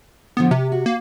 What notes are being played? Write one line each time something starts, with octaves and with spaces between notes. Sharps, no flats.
A2 D3 F3 B3
C3 G4
F#4
A#3